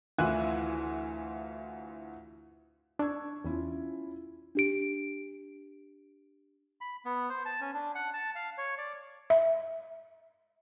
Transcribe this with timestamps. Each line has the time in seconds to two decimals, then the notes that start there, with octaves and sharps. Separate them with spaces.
0.18 D2 E3 E4 F4 G#5 F#6
2.99 D4 C#6 E6 G#6
3.45 E2 C#4 E4 F4
4.55 D4 G4 D7
6.81 B5
7.05 B3
7.30 C5
7.46 A5
7.61 C#4
7.74 D4
7.95 F#5
8.13 A5
8.35 F5
8.58 C#5
8.78 D5
9.30 E5